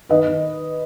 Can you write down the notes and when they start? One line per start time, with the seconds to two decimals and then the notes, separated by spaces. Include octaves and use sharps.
0.09 D#3 B4 D#5
0.27 D#3